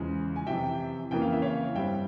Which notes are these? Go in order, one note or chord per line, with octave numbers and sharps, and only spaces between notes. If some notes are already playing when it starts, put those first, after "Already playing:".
Already playing: E2 C#3 F3 G#3
G#5
F2 C3 E3 E5 G5
F2 C#3 E3 A#3 G5
F5
E5
C#5 F5
G2 G3 C4 E5 G5